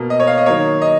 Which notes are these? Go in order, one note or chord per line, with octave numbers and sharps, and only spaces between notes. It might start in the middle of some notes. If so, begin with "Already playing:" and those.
Already playing: B2 A#3
D#5
C#5
F5
D#5
D#3 F#3 A#3 C#5
D#5